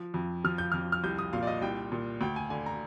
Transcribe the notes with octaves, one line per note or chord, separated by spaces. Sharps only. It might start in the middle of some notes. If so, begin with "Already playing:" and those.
Already playing: F3
F2
F3 F6
G6
F2 F6
F6
C2 G6
D#6
A#2 F5
D5
D#5
C2 G5
A#2
D2 G5
G#5
D3 G#5
A#5